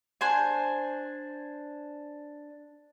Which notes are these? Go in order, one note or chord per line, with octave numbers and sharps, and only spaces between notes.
D4 C5 G#5